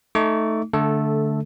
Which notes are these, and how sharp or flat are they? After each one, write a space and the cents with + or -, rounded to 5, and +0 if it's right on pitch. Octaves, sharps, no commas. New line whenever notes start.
A3 +0 D#4 +0 D6 -45
D3 -10 A3 -15 A4 +0